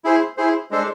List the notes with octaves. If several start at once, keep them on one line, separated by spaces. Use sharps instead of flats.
E4 G#4 C5
E4 G#4 C5
G#3 D4 A4 C5